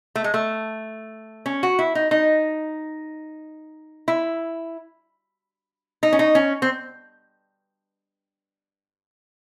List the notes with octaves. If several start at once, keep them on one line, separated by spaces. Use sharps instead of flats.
A3
G#3
A3
C#4
F#4
E4
D#4
D#4
E4
D#4
C#4
D#4
C#4
C4